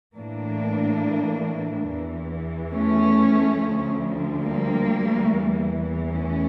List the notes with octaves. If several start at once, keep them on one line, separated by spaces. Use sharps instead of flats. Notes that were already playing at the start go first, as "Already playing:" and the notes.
A2 E3 A#3 D4
E2 E3
A3 C#4
D2 D3 F3
G3 A#3
E2 E3
A3 C#4